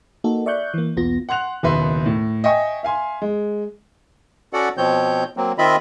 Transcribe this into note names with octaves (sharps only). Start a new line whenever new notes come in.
A#3 D#4 F#4 A4
D5 E5 C#6 F#6 G6
E3 A#3
B1 E2 B3 F4 A#6
F#5 C6 F#6 F7
F#1 D#2 B2 B4 E5 C6
A2
D#5 E5 G5 G#5 C#6
E5 F5 G#5 C6
G#3
C#4 F#4 A4 D5 F#5
B2 F3 C4 C#5 G6
F#3 A#3 C4
D#3 C4 F4 D#5 E5 B5